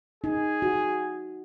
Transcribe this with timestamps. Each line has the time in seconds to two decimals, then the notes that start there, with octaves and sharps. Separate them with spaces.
0.24 D#4 G#4
0.62 F#4